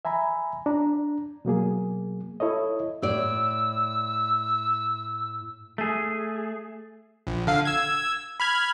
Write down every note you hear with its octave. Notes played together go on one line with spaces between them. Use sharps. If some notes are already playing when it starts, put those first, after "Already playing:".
E5 G#5 A#5 B5
D4 A#5
B2 F#3 A#3 G#4
E4 A4 C#5 D#5
A2 D5 E6
A3 G#4
A#1
D3 F5
E6 G#6
B5 F6 G#6